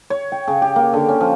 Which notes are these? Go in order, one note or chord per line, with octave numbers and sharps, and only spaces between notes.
C#5
G5
C#3
G4
A#3
D3
C#4
F3